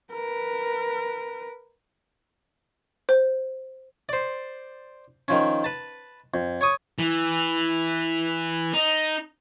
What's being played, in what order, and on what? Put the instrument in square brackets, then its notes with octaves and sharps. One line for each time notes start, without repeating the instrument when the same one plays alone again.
[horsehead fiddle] A#4 B4
[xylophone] C5
[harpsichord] C5 D5
D#3 F3 C#4
B4 A5
F2
C#5 C#6 D#6
[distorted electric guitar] E3
D#4